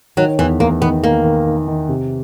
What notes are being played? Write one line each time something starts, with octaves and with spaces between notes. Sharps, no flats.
D#3 F#3
E2 E3
E2 A#3
D#3 B3
D#3 A#3
D#3
D#3
D#3
C3